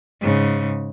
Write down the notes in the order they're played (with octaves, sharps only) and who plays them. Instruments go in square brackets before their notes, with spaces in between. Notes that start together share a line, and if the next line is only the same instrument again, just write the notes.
[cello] G#2 C#3